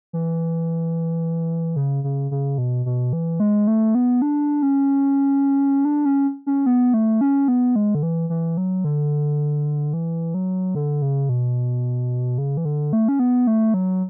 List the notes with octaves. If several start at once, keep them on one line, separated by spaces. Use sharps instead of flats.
E3
C#3
C#3
C#3
B2
B2
E3
G#3
A3
B3
D4
C#4
D4
C#4
C#4
B3
A3
C#4
B3
G#3
D3
E3
E3
F#3
D3
E3
F#3
D3
C#3
B2
C#3
E3
D3
A3
C#4
B3
A3
F#3